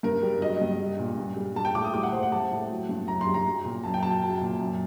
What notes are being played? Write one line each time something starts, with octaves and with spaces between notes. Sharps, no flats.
G2 A#4
G3
F#3 D#5
G2
G3
A#2
G2
G3
G3 A5
G5
A2 D6
D#6
G3 D6
F#5
A2 C5
F#5
G3 A5
A2
F#3
G2
F#2 A#5
C6
G3
A#5
F#3
A#2
F#2 A5
G5
F#3 A5
F#3
A#2
F#2